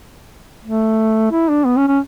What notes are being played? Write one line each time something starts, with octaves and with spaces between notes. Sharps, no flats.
A3
E4
D4
B3
C#4
C#4